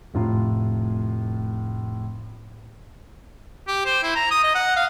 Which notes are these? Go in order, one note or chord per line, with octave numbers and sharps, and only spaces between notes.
F1 A2 F4 A#5 C6
G4
C5
E4
A#5
D#6
D#5
F#5
F5